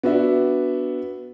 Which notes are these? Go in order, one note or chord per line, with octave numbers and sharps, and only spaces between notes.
B3 D4 F#4 E5